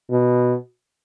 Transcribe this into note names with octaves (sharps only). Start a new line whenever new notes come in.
B2